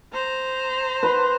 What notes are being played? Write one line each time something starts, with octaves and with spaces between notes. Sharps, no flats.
C5 A#5
B4 C6